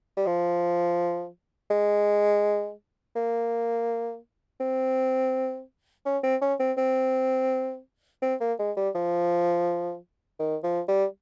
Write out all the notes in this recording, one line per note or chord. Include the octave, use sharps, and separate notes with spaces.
G3
F3
G#3
A#3
C4
C#4
C4
C#4
C4
C4
C4
A#3
G#3
G3
F3
D#3
F3
G3